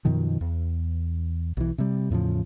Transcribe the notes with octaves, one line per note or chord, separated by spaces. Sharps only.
F#2 B2 D#3 F3
E2
B1 E3
C3 G3
E2 A2 C#3 F3